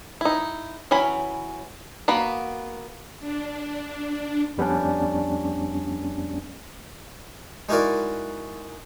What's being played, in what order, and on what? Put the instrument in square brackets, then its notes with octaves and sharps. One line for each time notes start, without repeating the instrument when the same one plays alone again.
[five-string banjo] D#4 E4
E3 F#3 C#4 B5
A#3 B3 F#4 B5
[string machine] D4
[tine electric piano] F2 G3 B3 C#4 D4
[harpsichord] G#3 D#4 E4 F#4 A#4 D5